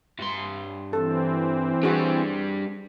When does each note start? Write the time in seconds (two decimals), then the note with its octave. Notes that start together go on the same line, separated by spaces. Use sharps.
0.19 G2 C6
0.93 E3 C4 A4
1.83 G3 D4 F#4 G#4